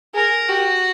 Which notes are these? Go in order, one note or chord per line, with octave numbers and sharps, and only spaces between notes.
G#4 A#4
F#4 G4